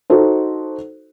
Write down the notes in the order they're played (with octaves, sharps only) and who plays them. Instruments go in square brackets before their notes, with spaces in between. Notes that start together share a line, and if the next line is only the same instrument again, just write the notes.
[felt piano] D#4 F#4 A4 C5